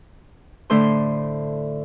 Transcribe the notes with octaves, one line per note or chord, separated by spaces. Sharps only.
A2 D3 A3 C5 C6